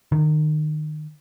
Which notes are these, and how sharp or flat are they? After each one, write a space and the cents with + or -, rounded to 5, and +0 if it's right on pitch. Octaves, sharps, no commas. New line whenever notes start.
D#3 -30